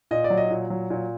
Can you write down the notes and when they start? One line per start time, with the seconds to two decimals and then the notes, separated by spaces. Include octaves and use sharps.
0.11 A#2 D#5
0.24 D5
0.30 F#3
0.37 D#5
0.50 A#2
0.70 F#3
0.90 A#2